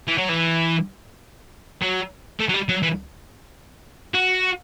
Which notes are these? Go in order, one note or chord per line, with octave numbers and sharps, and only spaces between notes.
E3
F#3
E3
F#3
A3
F#3
G3
F#3
E3
F#4